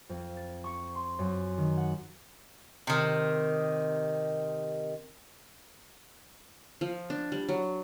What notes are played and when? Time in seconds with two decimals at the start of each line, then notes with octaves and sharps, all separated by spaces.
0.09 F2
0.37 A6
0.64 C#6
0.95 C6
1.19 F#2
1.58 D#3
1.77 F#5
2.87 C3 D#3
6.81 F3
7.10 D4
7.32 G3
7.49 F#3